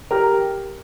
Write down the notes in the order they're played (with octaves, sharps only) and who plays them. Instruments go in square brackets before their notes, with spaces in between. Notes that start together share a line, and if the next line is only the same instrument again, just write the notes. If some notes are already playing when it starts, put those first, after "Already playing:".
[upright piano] G4 A#4